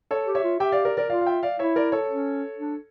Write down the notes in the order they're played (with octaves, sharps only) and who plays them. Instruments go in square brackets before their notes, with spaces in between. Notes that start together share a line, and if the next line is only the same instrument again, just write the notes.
[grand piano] A4 C#5
[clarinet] G4
[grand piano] C#5 E5
[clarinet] F4
[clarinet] G4 [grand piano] E5 G5
[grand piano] D5 F5
A#4 D5
A#4 D5
[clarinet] F4 [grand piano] D5 F5
[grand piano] F5
E5 G5
D5 F5
[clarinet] E4 [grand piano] C#5 E5
[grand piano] A#4 D5
A4 C#5
[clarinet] C#4
D4